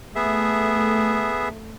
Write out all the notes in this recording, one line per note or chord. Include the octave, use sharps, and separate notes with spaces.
A3 B3 G#4 E5